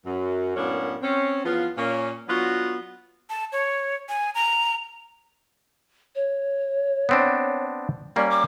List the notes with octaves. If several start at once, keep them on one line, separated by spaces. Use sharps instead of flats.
F#2
F#2 A2 A#3 B3 C#4 D4
C4 C#4
E2 F3 B3 F4
A#2 A#3 C#4
F#3 B3 D4 F4 F#4
A5
C#5
G#5
A#5
C#5
B3 C4 D4
G3 A#3 C#4 D5
D6